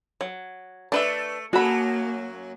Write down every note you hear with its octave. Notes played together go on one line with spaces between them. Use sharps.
F#3
A3 D4 B4 E5
F#2 F#3 A#3 F#4 G#4 A4 B5